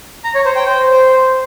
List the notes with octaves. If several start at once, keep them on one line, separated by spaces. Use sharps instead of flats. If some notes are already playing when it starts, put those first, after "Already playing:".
A#5
C#5
C5
G5
C5